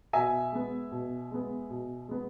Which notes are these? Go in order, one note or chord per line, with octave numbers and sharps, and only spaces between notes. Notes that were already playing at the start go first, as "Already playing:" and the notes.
B2 E5 G#5
G#3 B3
B2
G#3 B3
B2
G#3 B3